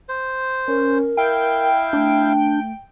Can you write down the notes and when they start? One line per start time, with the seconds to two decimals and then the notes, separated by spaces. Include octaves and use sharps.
0.09 C5
0.68 C#4 A#4
1.17 E4 F5 G5
1.93 A3 D4